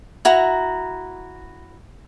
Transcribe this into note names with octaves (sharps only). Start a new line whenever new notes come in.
E4 F#4 A#5